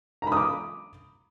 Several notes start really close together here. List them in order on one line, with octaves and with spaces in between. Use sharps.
A#5 B5 D#6 D6